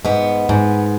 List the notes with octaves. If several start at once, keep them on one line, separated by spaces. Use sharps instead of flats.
G#2 B3
G#2